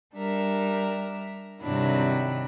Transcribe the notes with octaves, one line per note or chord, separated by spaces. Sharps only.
G3 D4 A#4 E5
G2 C3 D#3 F#3 D4 E4